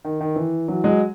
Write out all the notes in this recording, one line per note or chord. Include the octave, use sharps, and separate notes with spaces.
D#3
D#3
E3
E3 F#3
F#3 G#3